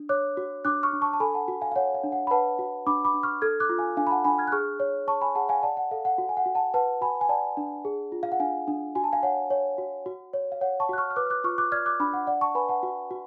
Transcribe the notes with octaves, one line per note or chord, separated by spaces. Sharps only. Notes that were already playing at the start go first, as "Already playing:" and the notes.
Already playing: D4
C#5 D6 F#6
F#4
D4 D6 F#6
C#6 F6
D4
A5 C#6
A5
A4 G#5 B5
F#5 A5
F#4
F5 G#5
F5
C#5 F#5
F5
D4
F#5
B5
B4 F#5 A5
F#4
D4 B5 D6
B5 D6
D4
C#6 F6
A4 F6 G#6
D6 F#6
F4
F5 G#5
D4 F5 G#5
B5
F#5 A5
D4 G#5 B5
F6 G#6
F#6
G#4 C#6 F6
C#5
C#5 A5 C#6
G#5 B5
G#4 F#5 A5
F5 G#5
D5 F#5 A5
F#5
A4 F5
F#5
F#4
G#5
F#5
F#4
F#5 A5
B4 F#5 A5
F#4 G#5 B5
G#5
D5 F#5 A5
D4
G#4
F4
F5
F#5
D4 F5 G#5
D4
F#4 G#5
A5
F5 G#5
C#5 F#5
C#5
F#4
F#4
C#5
F5
C#5 F#5
A5 C#6
F#4 F#6
C#6 F6
F6
B4 D6 F#6
F6
D6 F#6
F4 C#6 F6
D6 F#6
D5 F6 G#6
D6 F#6
D4 B5 D6
F#5
D5 F#5
A5 C#6
B4 G#5 B5
F#5 A5
F#4
F#4